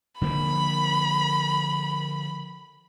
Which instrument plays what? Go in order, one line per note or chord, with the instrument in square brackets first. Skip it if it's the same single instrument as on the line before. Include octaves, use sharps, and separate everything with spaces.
[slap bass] D3 F3 A#3 [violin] B5